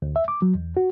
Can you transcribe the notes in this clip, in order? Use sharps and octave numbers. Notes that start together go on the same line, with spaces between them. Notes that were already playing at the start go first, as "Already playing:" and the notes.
D2
E5
D6
F#3
E2
F#4